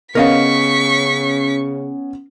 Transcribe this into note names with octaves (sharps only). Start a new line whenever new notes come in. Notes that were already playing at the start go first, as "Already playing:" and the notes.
C#3 B3 C#4 A#4 D#5 F5 C#6 B6